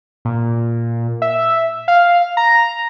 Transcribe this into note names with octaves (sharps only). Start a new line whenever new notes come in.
A#2
E5
F5
A#5